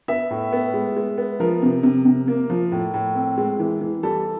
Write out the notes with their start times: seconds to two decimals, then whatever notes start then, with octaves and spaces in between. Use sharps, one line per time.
0.08 B3 E5
0.30 A2
0.52 B3
0.74 G#3
0.96 G#3
1.17 B3
1.40 F3 A#4
1.62 C3
1.83 C3
2.05 C3
2.28 A#3
2.50 F3
2.72 A2
2.94 A2
3.15 C4
3.38 G#3
3.59 E3
3.81 E3
4.03 G3 A4